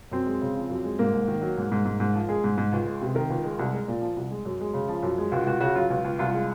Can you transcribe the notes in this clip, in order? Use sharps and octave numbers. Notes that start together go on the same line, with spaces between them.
F#2 C4
G#3
C#3
F3
F#2
G#3
G#2 A#3
G#2
D#3
F#3
G#2
G#2
G#2
G#2
F3
G#3 G#4
G#2
G#2
C#2
G#3
C3
D#3 A#4
C#2
G#3
C2
G#3
A#2
F3
C2
G#3
F#2
G#3
C#3
F3
F#2
G#3
C#2 F#4
C#2 F#4
C#3 F#4
F#3 F4
C#2
C#2
C2 F4
G#3